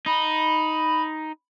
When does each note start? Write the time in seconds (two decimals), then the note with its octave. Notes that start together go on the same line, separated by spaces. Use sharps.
0.06 D#4 B5